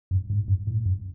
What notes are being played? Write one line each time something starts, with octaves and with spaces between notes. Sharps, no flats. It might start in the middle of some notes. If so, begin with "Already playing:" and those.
F#2
G#2
F#2
A2
F#2